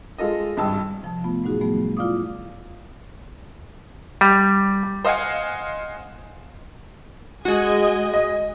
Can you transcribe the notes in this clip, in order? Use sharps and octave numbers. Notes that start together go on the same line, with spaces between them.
G#3 F4 A4 D#5
G#1 G2 A5 E6
C3 F3 A5
A3 B3 F4
A2 F#3 D#4 F#4 G#4
F3 G3 A3 B3
E4 F4 D5 F5 D6 D#6
G3
C5 D#5 F5 F#5 G#5
G#3 F#4 G#4 D#5 G#5
D#5